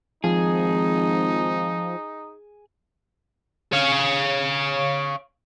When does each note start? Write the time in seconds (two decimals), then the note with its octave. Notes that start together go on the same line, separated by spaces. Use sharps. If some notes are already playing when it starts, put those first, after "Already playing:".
0.24 G#1 F3 D#4 G#4
3.73 C#5 F5